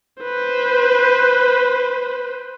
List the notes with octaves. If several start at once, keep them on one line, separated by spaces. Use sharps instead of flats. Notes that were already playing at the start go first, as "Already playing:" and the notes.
B4 C5